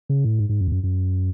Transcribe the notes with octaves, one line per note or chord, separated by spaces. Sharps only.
C#3
A2
G#2
G#2
F#2
E2
F#2
F#2